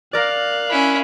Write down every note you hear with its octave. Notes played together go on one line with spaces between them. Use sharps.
A#4 D5 F5 F#6
C#4 E4